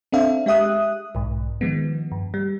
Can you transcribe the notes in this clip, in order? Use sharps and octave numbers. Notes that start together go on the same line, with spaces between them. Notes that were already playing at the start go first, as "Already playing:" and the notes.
C4 D4 A4 E5 F5
G#3 G4 E5 D#6 F#6
B1 G#2
D#3 F3 G#3 B3
G2
G3